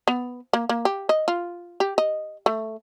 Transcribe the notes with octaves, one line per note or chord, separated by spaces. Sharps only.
B3
A#3
A#3
G4
D#5
F4
G4
D#5
A3